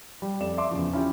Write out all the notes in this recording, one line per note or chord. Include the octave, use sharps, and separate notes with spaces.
G3
F2 D5 E7
E5 C6 D6
E2 C#3 F3
C#4 E4 F4 G4